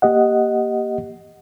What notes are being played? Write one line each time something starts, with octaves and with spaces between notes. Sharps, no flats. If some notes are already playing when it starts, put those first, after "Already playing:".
A#3 G4 D#5 F#5